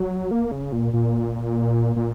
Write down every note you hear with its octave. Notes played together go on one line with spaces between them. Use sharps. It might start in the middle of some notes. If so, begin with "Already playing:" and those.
Already playing: F#3
A#3
C#3
A#2
A#2
A#2